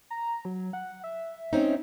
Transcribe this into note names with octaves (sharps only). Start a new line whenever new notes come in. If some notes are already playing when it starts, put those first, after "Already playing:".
A#5
F#3
F#5
E5
C4 C#4 D#4